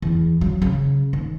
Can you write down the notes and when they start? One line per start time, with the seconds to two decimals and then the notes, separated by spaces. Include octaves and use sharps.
0.02 E2
0.41 F#3
0.62 C#3
1.13 D#2